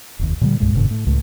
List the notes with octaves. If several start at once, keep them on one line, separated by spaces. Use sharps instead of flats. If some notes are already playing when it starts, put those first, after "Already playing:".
F1 D#2
A#2 D3 F#3 G3
C2 G2 A#2 G#3
F#1 G#2 B2 D3
A2
C#2 A2